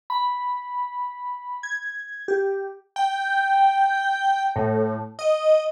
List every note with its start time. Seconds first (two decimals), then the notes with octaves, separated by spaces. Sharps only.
0.10 B5
1.63 G#6
2.28 G4
2.96 G5
4.56 A2
5.19 D#5